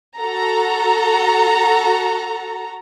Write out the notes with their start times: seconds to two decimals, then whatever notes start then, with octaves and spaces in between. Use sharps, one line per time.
0.18 F#4 A4 A#5